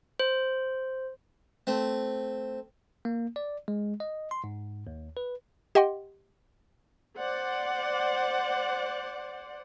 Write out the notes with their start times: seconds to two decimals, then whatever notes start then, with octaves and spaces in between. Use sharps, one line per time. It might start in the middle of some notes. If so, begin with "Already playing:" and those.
0.20 C5
1.67 A3 C4
3.05 A#3
3.36 D5
3.68 G#3
4.00 D#5
4.31 C6
4.44 G#2
4.87 D#2
5.17 B4
5.75 G4 D#5 F#5 G5 C6
7.19 C5 D5 F#5